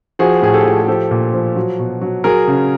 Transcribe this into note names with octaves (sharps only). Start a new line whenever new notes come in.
F3 F#4 G#4
A2 G#4
G4 A4
F3
G#4
F3 G4 A4
A#2
F3
F#3
B2
F#3
F#3 G#4 A#4
C#3